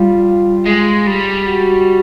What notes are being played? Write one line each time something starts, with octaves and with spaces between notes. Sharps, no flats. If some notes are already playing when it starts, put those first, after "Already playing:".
Already playing: G3 F4
G#3
G3
F#4